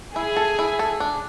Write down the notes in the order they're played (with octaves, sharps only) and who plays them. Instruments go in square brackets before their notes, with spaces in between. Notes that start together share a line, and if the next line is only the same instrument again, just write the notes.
[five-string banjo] E4 [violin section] G#4
[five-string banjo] A4
E4
A4
D4